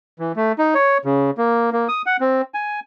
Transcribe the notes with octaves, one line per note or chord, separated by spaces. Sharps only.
E3
A3
D#4
C#5
C#3
A#3
A#3
D#6
F#5
C4
G#5